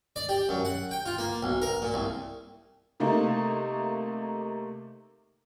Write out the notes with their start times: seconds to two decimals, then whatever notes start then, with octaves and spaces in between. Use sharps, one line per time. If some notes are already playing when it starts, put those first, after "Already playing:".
0.16 D5
0.29 G4
0.49 F#2
0.65 F#5
0.91 G5
1.06 F4
1.18 A#3
1.43 B1
1.62 A#4
1.82 A#2
1.94 C2
3.00 C3 A3 A#3 D#4